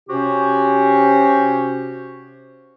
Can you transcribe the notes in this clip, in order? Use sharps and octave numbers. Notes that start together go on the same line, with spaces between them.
C3 C#4 F#4 G4 C5